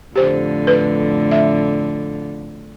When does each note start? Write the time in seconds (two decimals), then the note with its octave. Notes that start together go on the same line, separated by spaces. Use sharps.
0.16 F2 A2 D3 G4 C5
0.67 B4
1.31 E5